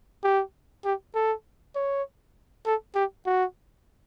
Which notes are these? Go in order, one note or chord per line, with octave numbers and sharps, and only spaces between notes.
G4
G4
A4
C#5
A4
G4
F#4